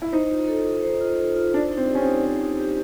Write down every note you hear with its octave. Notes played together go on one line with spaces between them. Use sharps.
E4
D#4 C5
F4
A4
F4
C5
F4
A4
F4
D4 C5
D#4
C4
G4
C#4
C4
D#4
C5
D#4
G4